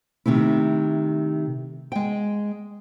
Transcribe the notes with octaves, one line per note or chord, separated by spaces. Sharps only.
C3 D#3 A3 E4
G#3 G5